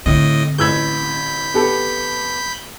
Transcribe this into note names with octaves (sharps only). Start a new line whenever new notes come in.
A2 D3 C4 D#5
A1 B5 E6 G6 G#6
B3 G4 A4